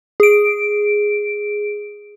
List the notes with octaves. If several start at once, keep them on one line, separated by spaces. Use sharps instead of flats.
G#4 D7